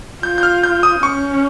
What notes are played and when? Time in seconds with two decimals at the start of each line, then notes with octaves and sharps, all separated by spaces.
0.23 F4 G6
0.38 G6
0.43 F6
0.64 G6
0.83 D#6
1.03 C#4 C#6